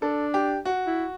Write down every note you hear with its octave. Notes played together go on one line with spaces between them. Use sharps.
D4 A4
G4
F#4
E4